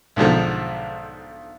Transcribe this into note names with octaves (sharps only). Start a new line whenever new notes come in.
B1 G#2 D3 F3